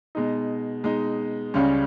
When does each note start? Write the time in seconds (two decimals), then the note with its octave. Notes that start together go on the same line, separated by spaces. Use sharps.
0.15 B2 G#3 D#4
0.84 B2 G#3 D#4
1.54 C#2 C#3 G3 C#4